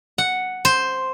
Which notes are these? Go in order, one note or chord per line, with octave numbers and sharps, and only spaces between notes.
F#5
C5